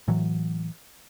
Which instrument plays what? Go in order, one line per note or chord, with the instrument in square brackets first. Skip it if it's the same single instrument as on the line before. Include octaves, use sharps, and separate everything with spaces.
[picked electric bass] A2 E3 F#3